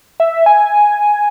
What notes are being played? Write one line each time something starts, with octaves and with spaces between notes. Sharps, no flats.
E5
G#5